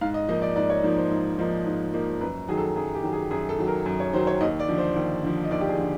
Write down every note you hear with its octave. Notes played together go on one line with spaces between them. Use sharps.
G#2 F5
D#5
F3 A#3 D#4 D#5
D5
G#2 D5
C#5
F3 A#3 D#4
C5
G#2
F3 A#3 D#4
G#2
F3 A#3 D#4
F#2 B4
D#3 F#3 G#4
A4
F#2 G#4
G4
D#3 F#3
G#4
F#2 G#4
A4
D#3 F#3
A#4
F#2
C#5
D#3 F#3 C5
C#5
D#2 D#5
D5
D3 F3
C5
D#2
D3 F3
D#5
D#2 D5
G4
G#4
D3 F3